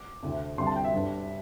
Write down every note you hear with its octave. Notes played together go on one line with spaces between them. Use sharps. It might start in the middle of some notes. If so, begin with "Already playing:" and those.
Already playing: D6
D2 C3 A3 C4
D2 C3 G3 C4 C6
A5
G5
E5
G1 G2 G3 D4